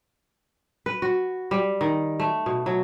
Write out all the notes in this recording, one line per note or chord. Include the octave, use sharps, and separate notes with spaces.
B4
F#4
G3
D#3
A3
B2
F#3